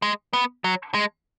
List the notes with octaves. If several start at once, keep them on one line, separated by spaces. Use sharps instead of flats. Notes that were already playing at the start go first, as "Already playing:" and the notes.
G#3
B3
F#3
G#3